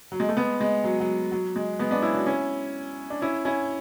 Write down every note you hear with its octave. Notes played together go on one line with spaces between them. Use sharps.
F#3
G#3
A3
G#3 B3
G#3
F#3
F#3
F#3
G#3
G#3 B3
B3 D4
C#4 E4
D4 F#4
C#4 E4
D4
C#4 E4
C#4 E4